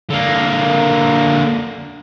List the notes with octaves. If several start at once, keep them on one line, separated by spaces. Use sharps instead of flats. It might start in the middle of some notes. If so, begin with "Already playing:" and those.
D3 A#3